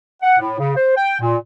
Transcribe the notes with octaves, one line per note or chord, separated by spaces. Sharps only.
F#5
A2
C#3
C5
G5
A#2